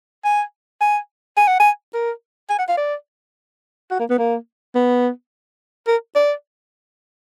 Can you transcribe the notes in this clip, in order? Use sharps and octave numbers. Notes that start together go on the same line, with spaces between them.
G#5
G#5
G#5
F#5
G#5
A#4
G#5
F#5
F5
D5
F#4
A#3
B3
A#3
B3
A#4
D5